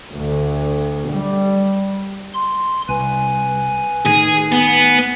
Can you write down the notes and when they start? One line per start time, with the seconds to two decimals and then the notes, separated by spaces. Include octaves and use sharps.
0.13 D2
1.11 G3
2.34 C6
2.89 C2 B4 G#5
4.05 A2 D#3 G#4
4.52 B3